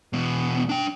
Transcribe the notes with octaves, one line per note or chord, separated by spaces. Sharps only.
E2 B2
D4 G5